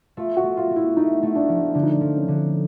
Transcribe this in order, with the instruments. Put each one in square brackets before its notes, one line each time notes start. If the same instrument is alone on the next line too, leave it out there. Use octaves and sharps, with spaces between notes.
[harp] A3 [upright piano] F4
[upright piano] F#4
[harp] A3
[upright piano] F4
[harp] A3
[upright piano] E4
[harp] A3 [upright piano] D#4
[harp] A3
[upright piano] D4
[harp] F3
[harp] D3 [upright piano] D4
[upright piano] D#4
D4
[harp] F3
[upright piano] C#4
[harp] D3 [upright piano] D4